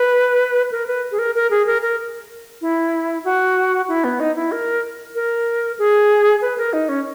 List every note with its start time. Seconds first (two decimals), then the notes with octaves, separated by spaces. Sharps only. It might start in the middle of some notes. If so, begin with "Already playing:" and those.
Already playing: B4
0.72 A#4
0.87 B4
1.12 G#4
1.19 A#4
1.35 A#4
1.51 G#4
1.67 A#4
1.82 A#4
2.61 E4
3.25 F#4
3.88 E4
4.04 B3
4.20 D#4
4.36 E4
4.52 A#4
5.15 A#4
5.79 G#4
6.42 B4
6.58 A#4
6.73 D#4
6.89 C#4